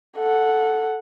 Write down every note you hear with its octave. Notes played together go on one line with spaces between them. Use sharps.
A4 F#5